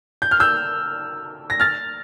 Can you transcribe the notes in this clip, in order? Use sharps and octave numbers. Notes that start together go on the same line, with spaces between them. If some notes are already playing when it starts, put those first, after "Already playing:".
G6
F6
E6 G6
A#6
F6 A6